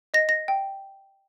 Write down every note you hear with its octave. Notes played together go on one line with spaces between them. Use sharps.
D#5 A#6
A#6
G5